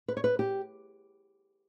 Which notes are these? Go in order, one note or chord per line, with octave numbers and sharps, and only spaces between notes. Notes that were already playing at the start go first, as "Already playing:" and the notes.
B4
C#5
B4
G4